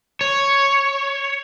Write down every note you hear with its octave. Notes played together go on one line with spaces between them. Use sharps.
C#5